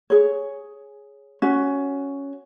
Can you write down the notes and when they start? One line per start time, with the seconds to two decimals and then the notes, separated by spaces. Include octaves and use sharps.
0.10 G#4 C#5
1.42 C#4 F#4